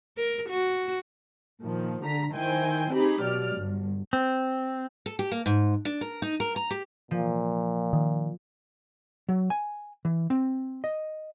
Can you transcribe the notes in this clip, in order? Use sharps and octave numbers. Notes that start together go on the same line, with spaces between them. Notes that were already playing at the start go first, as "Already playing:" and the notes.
A#4
F#4
A#2 D#3 F3
D3 A#5 B6
D#3 E4 C5 G5 G#5
C4 D#4 G4 G#4 B5
B2 F#3 D5 F6
G1
C4
A4
G4
A#3
G#2
D4
A#4
D#4
A#4
A#5
G4
A#2 F3
D#3
F#3
G#5
E3
C4
D#5